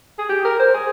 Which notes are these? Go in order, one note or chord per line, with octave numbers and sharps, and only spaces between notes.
G#4
G4
A#4
C5
G#4